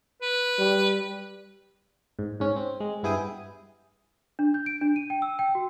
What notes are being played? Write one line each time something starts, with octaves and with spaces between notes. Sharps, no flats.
B4
G3
G#2
G#2 C#4
C4
G#3
G2 B3 E4 G#4 G5 D#6
D4
G6
D7
D4
D#7
G5
E6
G5
F#4